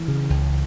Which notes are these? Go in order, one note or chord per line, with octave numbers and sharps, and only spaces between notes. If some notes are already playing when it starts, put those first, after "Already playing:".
Already playing: E3
C#3
C#2